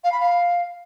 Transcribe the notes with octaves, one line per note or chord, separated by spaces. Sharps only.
F5
B5
F5